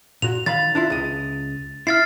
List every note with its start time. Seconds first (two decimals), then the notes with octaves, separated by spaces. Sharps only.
0.22 A#2 F#4 F7
0.46 D#3 F5 B5 A6
0.75 D4 E4 F4
0.90 C#2 D#5
1.87 E4 F6 A6 C7